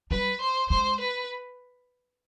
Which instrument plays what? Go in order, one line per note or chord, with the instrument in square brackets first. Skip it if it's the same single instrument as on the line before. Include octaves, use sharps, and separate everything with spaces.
[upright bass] G3 [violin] B4
[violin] C5
[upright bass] G#3 [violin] C5
[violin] B4